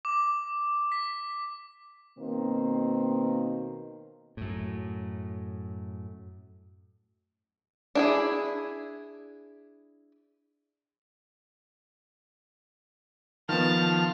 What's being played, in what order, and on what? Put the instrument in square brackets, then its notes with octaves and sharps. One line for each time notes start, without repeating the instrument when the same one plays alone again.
[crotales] D6
B6
[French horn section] B2 D#3 A#3 C4
[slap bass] F#2 A2
[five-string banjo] D4 E4 G#4
[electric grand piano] D#3 B3 [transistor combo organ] F3 F6 [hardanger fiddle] A5